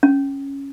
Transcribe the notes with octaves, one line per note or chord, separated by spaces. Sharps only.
C#4